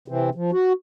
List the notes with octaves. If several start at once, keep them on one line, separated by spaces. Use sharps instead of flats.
C3 E3 C4
F3
F#4